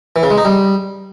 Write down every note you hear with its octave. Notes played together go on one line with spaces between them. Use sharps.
E3
C#3
G#3
D#4
G3